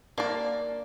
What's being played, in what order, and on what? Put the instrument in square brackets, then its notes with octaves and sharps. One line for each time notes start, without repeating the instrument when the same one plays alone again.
[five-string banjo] A#3 D5 [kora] D4